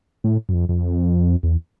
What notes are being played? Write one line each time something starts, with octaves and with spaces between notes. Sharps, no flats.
A2
F#2
F2
F2
E2